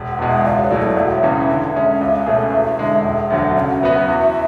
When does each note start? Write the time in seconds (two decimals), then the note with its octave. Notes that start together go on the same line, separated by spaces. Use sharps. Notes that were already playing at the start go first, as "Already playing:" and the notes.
Already playing: E1
0.11 F#5
0.19 E2 B2 G#3
0.28 E5
0.45 C#2 D5
0.63 C#5
0.71 B2 F#3 A3 E4
0.79 D5
0.97 E1 E5 F#5
1.23 E2 C#3 E3 E5
1.48 D3 E5
1.75 G#3 C#4
2.01 C#2
2.26 B2 A3 C#4 G#4
2.52 E2
2.79 D3 G#3
3.04 E1
3.30 D2 D3 F#3
3.56 C#3 E5 F#5
3.82 F#3 B3 F#4 B4
4.08 E2